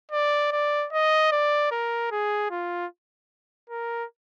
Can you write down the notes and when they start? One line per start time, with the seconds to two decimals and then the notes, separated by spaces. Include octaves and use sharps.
0.11 D5
0.52 D5
0.92 D#5
1.31 D5
1.71 A#4
2.11 G#4
2.50 F4
3.69 A#4